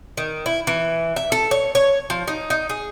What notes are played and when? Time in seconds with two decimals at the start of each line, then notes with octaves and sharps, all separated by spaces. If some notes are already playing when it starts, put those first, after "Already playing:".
0.17 D#3
0.46 E4
0.67 E3
1.16 E5
1.32 A4
1.51 C#5
1.75 C#5
2.10 F3
2.28 D#4
2.50 D#4
2.69 G#4